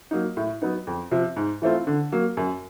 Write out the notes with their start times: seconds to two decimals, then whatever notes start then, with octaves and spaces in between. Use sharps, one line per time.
0.11 F#3 A#3 D#4
0.37 A2
0.62 F#3 B3 D#4
0.87 F2
1.11 C3 F3
1.36 G#2
1.62 E3 A3 C4 F4
1.87 D3
2.12 F#3 A#3
2.37 F#2